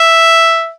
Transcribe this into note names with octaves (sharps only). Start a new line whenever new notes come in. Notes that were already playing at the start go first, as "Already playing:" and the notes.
Already playing: E5